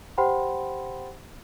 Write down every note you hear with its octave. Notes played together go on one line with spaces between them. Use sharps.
G4 C5 F#5 G5 B5 C6